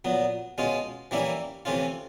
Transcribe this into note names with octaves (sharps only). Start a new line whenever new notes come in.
A#2 F#3 B3
B2 G#3 C#4 F4
E3 G3 A#3 C#4 E4
C3 E3 A3 C#4 F4